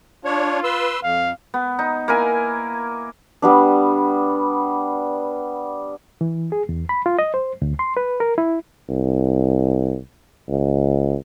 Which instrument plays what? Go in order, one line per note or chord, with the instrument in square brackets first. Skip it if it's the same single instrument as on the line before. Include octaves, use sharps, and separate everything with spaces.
[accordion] D4 C#5 [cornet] F4
[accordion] B4 C6 E6
[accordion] F2 [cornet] F5
[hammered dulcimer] B3
D#4
A#3 E4 A#4 G#5
[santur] G3 B3 D4
[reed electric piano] E3
G#4
E2
B5
F4
D#5
C5
D2
C6
B4
A#4
E4
[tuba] C2
C#2